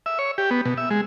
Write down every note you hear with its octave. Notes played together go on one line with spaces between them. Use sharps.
E5
C#5
G4
B3
B2
E5
G#3